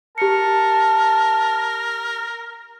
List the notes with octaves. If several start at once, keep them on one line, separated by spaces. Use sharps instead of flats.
G4 A#4 A5 C#7